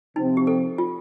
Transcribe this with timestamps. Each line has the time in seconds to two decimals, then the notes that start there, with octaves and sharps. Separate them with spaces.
0.16 C3 F3 C4 D#4
0.37 G4
0.47 A4
0.78 F4